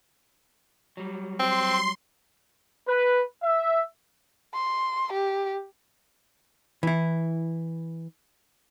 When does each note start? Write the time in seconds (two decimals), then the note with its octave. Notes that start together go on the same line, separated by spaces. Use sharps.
0.97 F#3 G3
1.39 C4 C6
2.87 B4
3.43 E5
4.54 C6
5.13 G4
6.83 E3 E4